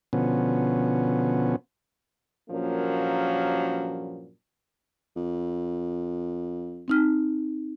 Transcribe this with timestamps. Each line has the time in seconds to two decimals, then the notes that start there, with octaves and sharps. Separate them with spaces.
0.13 B2 D3 F3 B3 C#4
2.50 G2 A#2 F3 F#3 A#3 C#4
5.16 F2
6.88 C4 D#4 F6